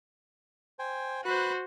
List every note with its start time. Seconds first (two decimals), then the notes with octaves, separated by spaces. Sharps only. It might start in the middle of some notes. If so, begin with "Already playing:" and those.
0.79 C5 G5 G#5
1.25 F#4 B4 C5 F#6